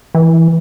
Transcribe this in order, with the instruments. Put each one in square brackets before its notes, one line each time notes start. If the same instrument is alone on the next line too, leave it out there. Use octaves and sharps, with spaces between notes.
[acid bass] E3